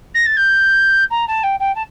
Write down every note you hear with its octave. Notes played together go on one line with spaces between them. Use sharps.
A#6
A6
G6
A#5
A5
G5
G5
A5